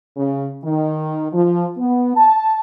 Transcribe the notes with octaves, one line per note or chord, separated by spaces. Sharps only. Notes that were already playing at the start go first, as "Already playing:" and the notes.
C#3
D#3
F3
B3
A5